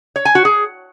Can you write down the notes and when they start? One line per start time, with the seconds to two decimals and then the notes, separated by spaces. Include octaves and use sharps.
0.16 C#5
0.25 G#5
0.35 F#4
0.45 G#4